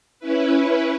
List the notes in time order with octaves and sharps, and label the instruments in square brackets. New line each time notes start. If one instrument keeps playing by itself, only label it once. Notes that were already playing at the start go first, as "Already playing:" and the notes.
[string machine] C#4 E4 B4